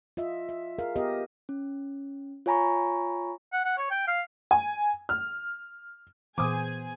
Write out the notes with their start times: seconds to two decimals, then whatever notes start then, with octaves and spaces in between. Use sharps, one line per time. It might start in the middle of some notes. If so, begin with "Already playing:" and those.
0.17 F4 D#5 E5
0.49 E5
0.78 G#4 A#4 F5
0.96 B3 G4 A#4 D#5
1.49 C#4
2.46 F4 C#5 G#5 A#5 B5 C#6
3.53 F#5
3.65 F#5
3.78 C#5
3.91 G5
4.08 F5
4.51 G#5
5.09 F6
6.38 A#2 E3 B3 G#4 C5 G#5 D6 D#6